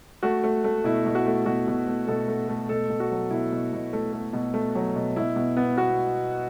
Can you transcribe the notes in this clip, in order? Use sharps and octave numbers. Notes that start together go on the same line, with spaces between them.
A3 F#4
A3
A3
B2 E4
B2
F#4
A3
B2 F#4
B2
A3
B2 A4
A3
A3
B2 A4
B2
F#4
F#3
B2 E4
B2
B2
A3
A3
B2
A3
F#3
B2
B2 E4
B2
B3
B3 F#4